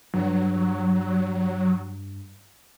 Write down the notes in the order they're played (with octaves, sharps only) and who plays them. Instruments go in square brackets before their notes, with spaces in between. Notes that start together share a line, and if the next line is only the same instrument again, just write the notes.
[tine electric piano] G2 [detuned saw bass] F#3